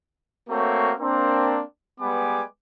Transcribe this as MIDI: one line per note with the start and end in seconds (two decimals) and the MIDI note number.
0.50 0.92 57
0.50 0.92 58
0.50 0.92 60
0.50 0.92 66
0.50 0.92 72
0.50 0.92 73
1.00 1.62 58
1.00 1.62 60
1.00 1.62 62
2.01 2.43 55
2.01 2.43 56
2.01 2.43 59
2.01 2.43 71
2.01 2.43 80
2.01 2.43 86